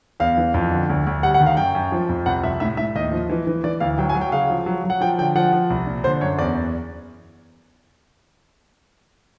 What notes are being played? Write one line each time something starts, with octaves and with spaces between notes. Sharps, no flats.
E2 F5
E3
F2
D3
D2
D2
G3 F#5
F#5
D#3
F5
F#2 G5
F#2
F3
F2
C2 F#5
C2 E5
A2 E5
A2 E5
D#2 D#5
F3
E3
E3
E3 D5
D2 F5
F#3 G5
G#5
F#3
G5
C#3 F5
F3
F#3
F#3
F#5
F3 G5
D3 G5
F3 F#5
F3
C2
A#2
D3 C5
F#2 C#5
E2 D5